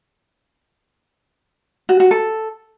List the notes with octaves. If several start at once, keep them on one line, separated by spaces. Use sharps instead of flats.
F#4
F#4
A4